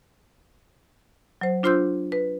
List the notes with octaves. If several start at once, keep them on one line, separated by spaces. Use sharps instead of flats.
F#3 C5
D4 F4 C5 C6 E6 G6
B4